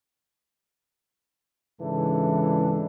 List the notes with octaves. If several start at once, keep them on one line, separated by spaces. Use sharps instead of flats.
G#2 C#3 E3 G#3 D4 A4